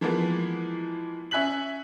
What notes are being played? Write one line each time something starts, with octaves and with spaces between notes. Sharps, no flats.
E3 F3 G#3 A#3 B3
C#4 E5 G#5 F#6 B6 F#7